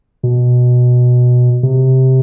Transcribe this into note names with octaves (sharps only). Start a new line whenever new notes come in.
B2
C3